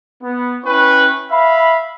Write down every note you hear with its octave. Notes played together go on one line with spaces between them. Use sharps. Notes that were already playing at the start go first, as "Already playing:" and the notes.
B3
C#4 E4 B4 G5 C#6
E5 F5 B5